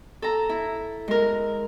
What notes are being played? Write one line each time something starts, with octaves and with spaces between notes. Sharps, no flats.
A4 A#5
E4
G#3 A#4